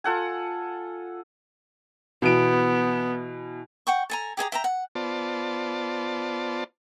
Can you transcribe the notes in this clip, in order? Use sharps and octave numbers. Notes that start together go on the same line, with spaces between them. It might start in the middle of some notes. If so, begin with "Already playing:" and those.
F4 A4 F#5 G#5
B2 E3 B3 D7
F#5 G5 C#6
A4 G#5 A#5
G4 G#4 G#5 A#5
E5 G5 A5 A#5
F#5
B3 F4 C5 D5 A5